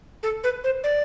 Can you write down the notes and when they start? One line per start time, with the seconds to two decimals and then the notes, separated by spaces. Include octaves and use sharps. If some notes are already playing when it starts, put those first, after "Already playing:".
0.23 A4
0.44 B4
0.64 C5
0.84 D5